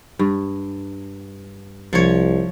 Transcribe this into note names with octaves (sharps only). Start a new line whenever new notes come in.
G2
C2 F3 C#5